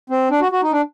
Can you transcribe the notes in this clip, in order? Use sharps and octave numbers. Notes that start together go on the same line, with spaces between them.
C4
D4
F#4
F#4
D#4
D4